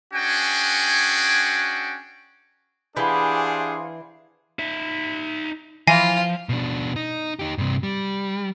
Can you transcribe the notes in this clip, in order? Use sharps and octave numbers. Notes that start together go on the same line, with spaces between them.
C#4 D4 F#4 G#4 G5 G#5
E3 D4 G4 G#4 C5 F5 F#5
D#4 E5
E3 F3 F4 G#5 A#6 C7
B2 D4
D#4
D#4 G4
G2 C3
G3